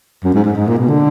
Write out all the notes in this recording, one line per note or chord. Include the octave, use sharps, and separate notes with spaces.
F#2
G#2
G#2
G#2
A#2
B2
D3